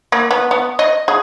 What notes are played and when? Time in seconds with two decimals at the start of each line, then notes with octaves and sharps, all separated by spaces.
0.12 A#3
0.31 B3
0.51 B3
0.79 D#5
1.08 G#4